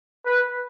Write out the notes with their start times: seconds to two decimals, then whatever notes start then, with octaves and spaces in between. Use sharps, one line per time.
0.26 B4